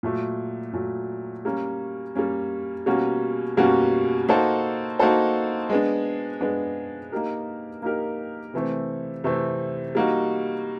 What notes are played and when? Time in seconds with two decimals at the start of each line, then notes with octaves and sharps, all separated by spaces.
0.03 A#2 F#3 A3
0.73 A#2 F#3 A3
1.45 G3 A#3 C#4
2.15 G3 A#3 C#4
2.86 B2 G3 A#3 C#4 F#4
3.57 B2 G3 A#3 C#4 F#4
4.29 A#3 D#4 F#4 A4 C5
4.99 A#3 D#4 F#4 A4 C5
5.70 G#3 B3 D4
6.41 G#3 B3 D4
7.12 A#3 D#4 G4 A#4
7.82 A#3 D#4 G4 A#4
8.54 C3 E3 A3 C4
9.24 C3 E3 A3 C4
9.95 G3 A#3 D#4 F#4